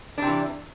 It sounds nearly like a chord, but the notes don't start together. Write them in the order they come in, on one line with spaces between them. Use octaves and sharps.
D4 C3 E3